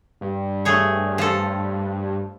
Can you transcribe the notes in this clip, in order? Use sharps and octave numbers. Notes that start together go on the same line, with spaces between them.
G2
A3 G#4 C#5
F3 A4